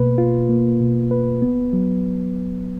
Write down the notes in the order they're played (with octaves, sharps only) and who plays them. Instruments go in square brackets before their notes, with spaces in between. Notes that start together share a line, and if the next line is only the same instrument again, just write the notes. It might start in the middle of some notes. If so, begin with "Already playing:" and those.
Already playing: [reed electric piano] B2 A#3 B4
F4
A#3
B2
B4
B3
F#3